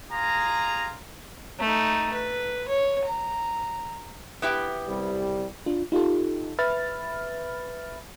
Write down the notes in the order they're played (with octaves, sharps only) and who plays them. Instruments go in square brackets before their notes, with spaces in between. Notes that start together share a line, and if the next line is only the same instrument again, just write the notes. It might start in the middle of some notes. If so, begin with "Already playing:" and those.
[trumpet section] F4 G#4 A#5
[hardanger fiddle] A3 D#4
B4
C#5
A#5
[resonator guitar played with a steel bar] B3 E4 G4
[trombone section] C2 G3
[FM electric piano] D4 F4
D#4 F4 G4 A4
B4 E5 B5 F6 A6